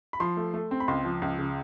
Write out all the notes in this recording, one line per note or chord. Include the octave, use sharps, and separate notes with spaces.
B5
F3 C6
A3
A3
C4
B5
C#2 C6
F3
C#2
C#3